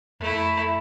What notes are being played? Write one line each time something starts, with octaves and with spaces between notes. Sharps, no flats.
F2 A3 E4